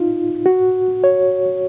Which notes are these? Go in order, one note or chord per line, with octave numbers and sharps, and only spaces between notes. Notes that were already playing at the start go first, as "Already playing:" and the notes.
Already playing: D#4 F4
F#4
C#5